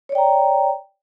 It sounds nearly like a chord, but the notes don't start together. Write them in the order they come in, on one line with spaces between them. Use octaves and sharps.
C#5 D5 G5 A#5